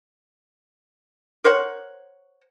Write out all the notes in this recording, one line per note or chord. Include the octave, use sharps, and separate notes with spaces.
A#4 C5 C#5 F#5